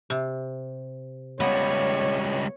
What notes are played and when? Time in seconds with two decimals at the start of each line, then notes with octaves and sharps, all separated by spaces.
0.10 C3
1.40 C#2 G3 B3 C#5